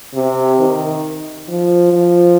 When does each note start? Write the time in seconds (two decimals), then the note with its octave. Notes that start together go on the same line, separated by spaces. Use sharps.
0.14 C3
0.60 D#3
1.48 F3
1.93 F3